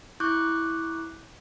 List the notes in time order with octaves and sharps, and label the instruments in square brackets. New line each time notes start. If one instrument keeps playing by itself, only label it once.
[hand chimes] E4 C#6 D6 F#6 G6